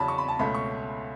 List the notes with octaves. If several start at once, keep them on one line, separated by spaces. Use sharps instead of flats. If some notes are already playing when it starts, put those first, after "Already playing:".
Already playing: E2 C#3 F#3 A5 B5
C#6
B5
A5
C#2 B2 A3 C#4 B5
C#6